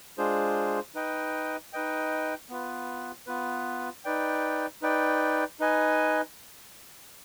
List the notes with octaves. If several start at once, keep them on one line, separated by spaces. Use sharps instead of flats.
G#3 D4 F4 G#4 C5
D#4 B4 D#5 G5
D#4 B4 D#5 G5
B3 F4 B4
B3 F4 B4
D#4 B4 D5 G5
D#4 B4 D5 G5
D#4 B4 D#5 G#5